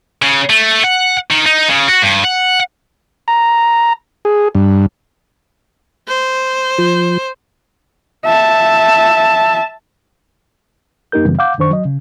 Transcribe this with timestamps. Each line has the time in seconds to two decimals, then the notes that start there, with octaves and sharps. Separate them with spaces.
0.22 C#3
0.50 A3
0.84 F#5
1.30 D#3
1.46 D#4
1.68 C#3
1.88 F#4
2.02 G2
2.24 F#5
3.28 A#5
4.25 G#4
4.55 G2
6.08 C5
6.78 F3
8.25 E5 A5
11.12 F#2 A#3 D#4 G4 A#4 G6
11.25 F#2 C#3 E3 G3 B3
11.39 F5 F#5 D6 G6
11.58 F#2 D#3 D4 C5 C#6
11.71 F#3 D#5
11.85 C#3